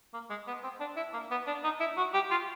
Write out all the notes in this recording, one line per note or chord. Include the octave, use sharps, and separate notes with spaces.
A#3
G#3
B3
C4
D4
E4
A#3
B3
D4
D#4
E4
F#4
G4
F4